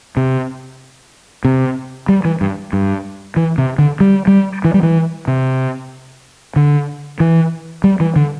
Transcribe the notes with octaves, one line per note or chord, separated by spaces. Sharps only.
C3
C3
G3
E3
G2
G2
E3
C3
D3
G3
G3
E3
G3
E3
C3
D3
E3
G3
E3
D3